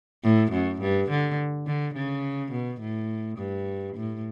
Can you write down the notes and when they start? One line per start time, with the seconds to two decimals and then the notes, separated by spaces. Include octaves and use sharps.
0.24 A2
0.52 F#2
0.81 G2
1.10 D3
1.67 D3
1.95 C#3
2.52 B2
2.80 A2
3.38 G2
3.95 A2